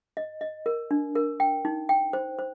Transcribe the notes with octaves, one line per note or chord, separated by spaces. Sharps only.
D#5
D#5
A#4
D4
A#4
G5
D#4
G5
C5
C5